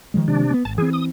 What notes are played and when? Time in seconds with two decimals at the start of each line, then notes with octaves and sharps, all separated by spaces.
0.14 D#3 F3 G#3
0.28 C3 D4
0.50 A#3 B3
0.65 G#1 A5
0.78 E3 C4 G#4
0.93 D#6